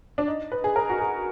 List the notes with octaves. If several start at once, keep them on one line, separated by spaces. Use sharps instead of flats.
D4
D#4
B4
G#4
A#4
F#4
G#4